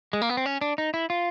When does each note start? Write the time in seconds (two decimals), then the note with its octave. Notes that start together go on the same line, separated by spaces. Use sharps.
0.13 G#3
0.22 A#3
0.29 B3
0.37 C4
0.46 C#4
0.61 D4
0.78 D#4
0.94 E4
1.10 F4